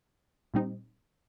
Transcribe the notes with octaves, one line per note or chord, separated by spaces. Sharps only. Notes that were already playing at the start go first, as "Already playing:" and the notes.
A#2 G3 C4 D#4